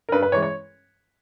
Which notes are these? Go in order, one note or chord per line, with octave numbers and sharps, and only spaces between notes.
A#4
G2 B4
B4
E3 G#3 C#5
C#5